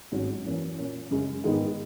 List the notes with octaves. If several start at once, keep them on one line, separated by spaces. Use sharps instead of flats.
G#1 G#2 F#3 C#4 F#4
F#2 E3 A#3 C#4
A#2 A#3 C#4
F#2 C#3 G#3
G#2 D#3 G#3 B3 D#4